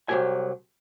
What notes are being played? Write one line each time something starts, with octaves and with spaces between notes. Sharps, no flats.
C2 E3 F#3 G4 G#5